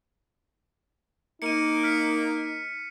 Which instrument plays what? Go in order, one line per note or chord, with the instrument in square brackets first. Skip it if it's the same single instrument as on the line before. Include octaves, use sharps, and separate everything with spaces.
[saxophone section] A#3 [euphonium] D#4 [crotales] C#7 D#7
[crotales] F6 B6 C#7